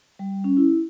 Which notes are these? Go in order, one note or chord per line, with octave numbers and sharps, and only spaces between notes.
G3
C#4
E4